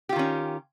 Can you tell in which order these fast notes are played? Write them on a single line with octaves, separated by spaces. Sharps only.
G4 F4 D#3 C#4